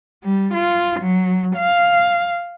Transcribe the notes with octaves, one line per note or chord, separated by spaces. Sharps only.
G3
F4
F#3
F5